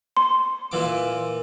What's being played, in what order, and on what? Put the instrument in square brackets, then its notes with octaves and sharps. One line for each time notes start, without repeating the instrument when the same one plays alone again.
[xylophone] C6
[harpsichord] A#2 E3 D6